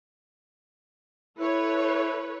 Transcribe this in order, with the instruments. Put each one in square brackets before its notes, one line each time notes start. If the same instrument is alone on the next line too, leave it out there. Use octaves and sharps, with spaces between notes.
[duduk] E4 [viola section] A4 B4 C#5